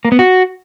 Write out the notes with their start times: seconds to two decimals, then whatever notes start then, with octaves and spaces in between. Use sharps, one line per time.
0.05 A#3
0.12 B3
0.19 F#4